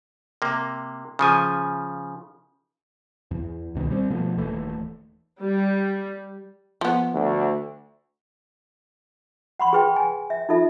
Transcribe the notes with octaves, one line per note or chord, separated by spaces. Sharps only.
C3 A#3
C#3 F3 G#5
E2
C#2 B2 D#3
G3 C4
B2 F3 A3
D#1 D#2 E3 A3
G3
F3 B3
D2
F#5 B5 C6
G#4 B4 G5
G#5
E5
D#4 F4 A4 E5